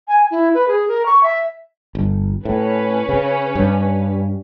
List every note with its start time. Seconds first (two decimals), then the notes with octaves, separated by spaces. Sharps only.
0.08 G#5
0.31 E4
0.54 B4
0.68 G#4
0.88 A#4
1.06 C#6
1.23 E5
1.95 G1
2.45 A2 C#4 B4
3.09 C#3
3.55 G2